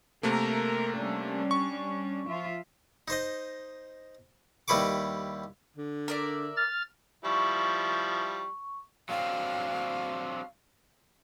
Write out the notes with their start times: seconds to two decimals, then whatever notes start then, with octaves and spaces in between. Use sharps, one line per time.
0.23 C3 A3 A#3 A#4
0.97 G3 C#4 D4
1.51 C#6
2.27 F3 F4 E5
3.08 D#4 C5 D#5
4.68 D#2 G3 E4 B4 C#6 D6
5.77 D3
6.08 A#4 D5 E5
6.57 F6 A6
7.25 F3 G3 E4 C#6
9.09 F#3 C4 D4 F5